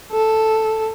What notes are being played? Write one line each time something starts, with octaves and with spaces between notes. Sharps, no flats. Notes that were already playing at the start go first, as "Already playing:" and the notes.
A4